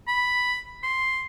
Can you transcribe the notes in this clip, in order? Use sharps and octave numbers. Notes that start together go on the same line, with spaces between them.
B5
C6